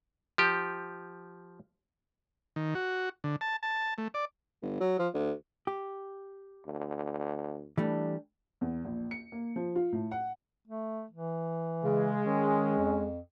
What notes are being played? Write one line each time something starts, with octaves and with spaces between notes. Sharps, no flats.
F3 G4
D#3
F#4
D3
A5
A5
A3
D5
G1
F#3
F3
D2
G4
D2
E3 G3 A3 D4
E2
A#1
C#7
A#3
F3
F4
A2
F#5
A3
E3
C#3 G#3
D#3 C#4
F2